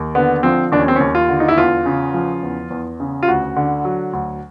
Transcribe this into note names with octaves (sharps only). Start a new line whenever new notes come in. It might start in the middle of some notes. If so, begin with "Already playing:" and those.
Already playing: D#2
D3 B3
F3 C4
D#2 D4
C#4
C4
D#2 C#4
F4
D3
D#4
E4
E2 F4
C#3
F3
E2
E2
C#3
F4
D2 F#4
D3
F#3
D2